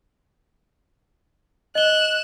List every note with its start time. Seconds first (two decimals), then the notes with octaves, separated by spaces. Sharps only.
1.75 D#5 F#6 E7 G7